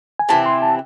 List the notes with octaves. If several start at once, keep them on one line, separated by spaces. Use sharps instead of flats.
G#5
C3 E3 C4 A5
C6
A5